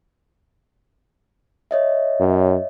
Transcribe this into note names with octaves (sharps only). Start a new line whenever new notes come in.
C#5 D#5 E5
F#2